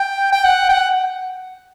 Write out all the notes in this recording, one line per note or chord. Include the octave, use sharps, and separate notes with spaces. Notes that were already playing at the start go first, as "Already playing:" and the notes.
Already playing: G5
G5
F#5
G5
F#5